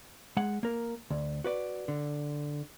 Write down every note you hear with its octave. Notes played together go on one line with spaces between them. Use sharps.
G#3 F#5
A#3 A#4
D2
F#4 B4 D5
D3